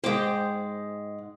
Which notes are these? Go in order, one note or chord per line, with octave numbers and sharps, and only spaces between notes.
G#2 G#3 C5 G5 D6